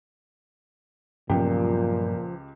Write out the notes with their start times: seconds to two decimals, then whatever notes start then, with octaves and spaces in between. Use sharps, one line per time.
1.29 C#2 G2 A#2 F3 F#3 B3 G4 G5